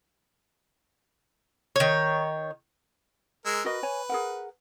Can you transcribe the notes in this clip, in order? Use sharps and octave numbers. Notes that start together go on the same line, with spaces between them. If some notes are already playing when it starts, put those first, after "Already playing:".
D#3 C#5
G#3 A#4 E6
F#4 A#4 B4 D#5
C#5 G#5
G#4 A#4 F#5